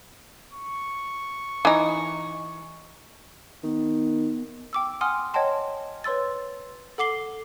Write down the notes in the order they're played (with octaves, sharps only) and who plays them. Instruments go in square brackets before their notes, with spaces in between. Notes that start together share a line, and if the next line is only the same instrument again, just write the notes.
[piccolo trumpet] C#6
[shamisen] E3 D#4
[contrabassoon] D#3 [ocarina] B3
[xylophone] G5 D6 E6
F#5 G#5 C6 D#6 F6
C#5 D#5 F#5 G5 A5 C6
B4 C#5 C6 E6 A6
A4 F#5 D6 C7 G7